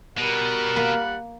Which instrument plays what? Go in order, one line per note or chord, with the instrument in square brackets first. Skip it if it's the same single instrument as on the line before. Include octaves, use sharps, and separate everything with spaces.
[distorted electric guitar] B2 [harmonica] G3 F#5 [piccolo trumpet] A#4
[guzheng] A#3 B5